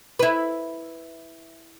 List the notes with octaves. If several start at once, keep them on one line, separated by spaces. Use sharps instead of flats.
E4 B4